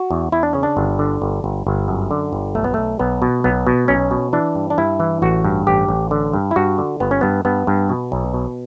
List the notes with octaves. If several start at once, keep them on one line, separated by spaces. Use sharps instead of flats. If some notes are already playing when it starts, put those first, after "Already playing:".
Already playing: F#4
E2
E2 E4
D4
C#3 C#4
D4
G1
D3
G1
G1
G1
F#2
D3
G1
B1 A3
B3
B1 A3
B1 B3
B2
B1 B3
B2
B1 C#4
B2
E3 D4
G2
D4
G2 E4
E3
A1 F#4
G2
A1 G4
A1
D3
G2
E4
G2 F#4
D3
G1 B3
C#4
G2 B3
G2 B3
G2
B2
B1
B2